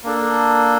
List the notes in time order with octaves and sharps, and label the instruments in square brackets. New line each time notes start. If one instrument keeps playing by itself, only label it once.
[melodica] A#3 D4 A4